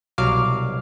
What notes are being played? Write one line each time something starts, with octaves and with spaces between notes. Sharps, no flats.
C2 B2 F#3 F5 D6 F6